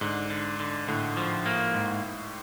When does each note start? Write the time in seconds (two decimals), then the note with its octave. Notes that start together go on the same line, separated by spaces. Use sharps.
0.01 G#2 D3
0.30 D3
0.60 D3
0.88 A2 D3
1.17 F3
1.46 A#3
1.74 G#2